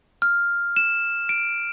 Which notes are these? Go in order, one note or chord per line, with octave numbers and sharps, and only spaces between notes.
F6
E7
D7